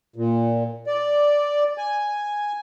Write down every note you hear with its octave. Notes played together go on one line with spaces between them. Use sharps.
A#2
D5
G#5